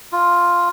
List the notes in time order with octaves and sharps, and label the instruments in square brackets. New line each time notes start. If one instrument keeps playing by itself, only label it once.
[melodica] F4